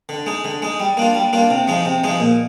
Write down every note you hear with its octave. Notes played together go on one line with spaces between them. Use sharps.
D3
G#3 D#4
D3
G#3 D#4
G3
A#3 D4 F4
G3
A#3 D4 F4
C3
F3 G#3 D#4
C3
F3 G#3 D#4
A#2